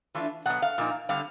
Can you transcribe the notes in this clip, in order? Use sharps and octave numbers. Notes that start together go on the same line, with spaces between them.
E3 A3 D4 F4
B2 F#3 B3 F#5
F5
A#2 F3 A#3 D#4
D3 G3 C4 F5